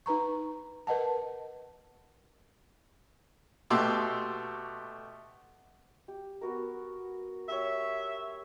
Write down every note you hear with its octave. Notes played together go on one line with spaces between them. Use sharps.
D#4 B4 A#5 C#6
A#4 B4 D#5 F#5 A5
B2 A3 G4 C6 D6 E6
G4
B3 F#4 A#4
G4 C#5 E5